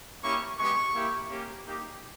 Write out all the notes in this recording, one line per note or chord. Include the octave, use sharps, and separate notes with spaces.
A#3 C#4 E4 G4 C#6
G#3 B3 G4 C#6
A#3 E4 G4
A#3 C#4 G4
A#3 D#4 G4